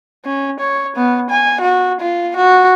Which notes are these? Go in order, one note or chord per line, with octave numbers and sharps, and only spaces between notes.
C#4
C#5
B3
G#5
F#4
F4
F#4